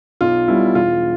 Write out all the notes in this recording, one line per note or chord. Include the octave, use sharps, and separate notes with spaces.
B1 F4
B2 G3 E4
E1 F4